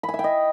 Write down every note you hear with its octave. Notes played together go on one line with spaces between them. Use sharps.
B5
G#5
E5
G5
D#5